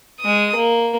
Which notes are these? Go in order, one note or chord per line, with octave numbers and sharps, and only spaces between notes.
G#3 D#6
A#3